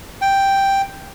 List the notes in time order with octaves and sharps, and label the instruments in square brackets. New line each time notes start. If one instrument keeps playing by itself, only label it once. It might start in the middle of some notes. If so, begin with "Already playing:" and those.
[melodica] G5